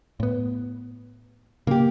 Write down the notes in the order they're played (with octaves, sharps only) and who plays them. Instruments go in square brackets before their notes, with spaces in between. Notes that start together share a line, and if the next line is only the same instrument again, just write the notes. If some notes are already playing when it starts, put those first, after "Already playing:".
[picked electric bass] A2 B3
[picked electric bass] C#3 [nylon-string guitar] A#3 G4